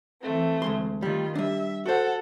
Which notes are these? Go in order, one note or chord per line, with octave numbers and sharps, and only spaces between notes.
E3 A3 C4
D2 G#3 C6
D#3 G3 A3 F4
G3 D4 E5
F#4 A4 C5 F#5